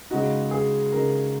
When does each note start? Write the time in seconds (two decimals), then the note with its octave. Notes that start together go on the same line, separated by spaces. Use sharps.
0.10 C#3 G#3 D#4 F#4
0.51 G#4
0.92 C#3 G#3 D#4 A#4